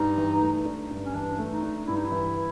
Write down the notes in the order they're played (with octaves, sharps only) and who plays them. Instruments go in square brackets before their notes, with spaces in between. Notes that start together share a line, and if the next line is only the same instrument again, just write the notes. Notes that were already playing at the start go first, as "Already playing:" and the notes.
Already playing: [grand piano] G2 [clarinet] D#4
[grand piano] E3
A3
D4
G2
[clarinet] C#4
[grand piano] E3 [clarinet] D4
[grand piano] A3
[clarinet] D#4
[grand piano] D4
[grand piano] G2 [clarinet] E4
[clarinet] D#4
E4
[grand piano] E3